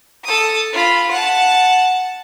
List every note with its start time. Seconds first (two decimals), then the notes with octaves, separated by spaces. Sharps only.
0.24 A4 D#6
0.73 F4 B5
1.11 F#5 A5